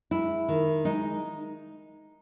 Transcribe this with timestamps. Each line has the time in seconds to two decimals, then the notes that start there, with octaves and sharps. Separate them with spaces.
0.11 G#3 E4
0.49 D#3
0.85 G#3 D#4